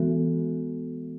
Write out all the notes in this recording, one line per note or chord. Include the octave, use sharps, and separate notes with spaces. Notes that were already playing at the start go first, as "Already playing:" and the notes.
Already playing: E3 G#3 B3 F#4 A4